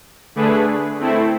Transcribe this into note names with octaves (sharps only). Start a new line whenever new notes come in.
D3 A3 D4 G#4 B4
A3 C4 E4